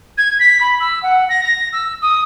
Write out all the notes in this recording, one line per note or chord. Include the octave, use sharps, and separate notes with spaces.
G#6
B6
B5
E6
F#5
A#6
A#6
E6
D#6